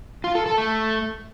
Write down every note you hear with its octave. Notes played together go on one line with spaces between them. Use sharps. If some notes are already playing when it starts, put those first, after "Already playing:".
F4
A4
A4
A3